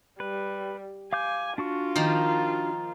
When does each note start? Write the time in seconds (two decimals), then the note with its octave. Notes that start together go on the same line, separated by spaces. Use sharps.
0.20 G3 B4
1.13 F5 G#5 D6 G6
1.58 D4 F4 F#4 C#6
1.96 D#3 F3 A#3